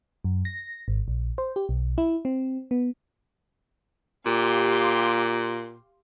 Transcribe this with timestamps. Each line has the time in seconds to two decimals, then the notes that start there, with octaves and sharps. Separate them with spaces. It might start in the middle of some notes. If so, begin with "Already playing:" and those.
0.25 F#2
0.45 A#6
0.88 G#1
1.08 A#1
1.38 C5
1.56 G4
1.69 B1
1.98 E4
2.25 C4
2.71 B3
4.26 A#2 G4 F5 C6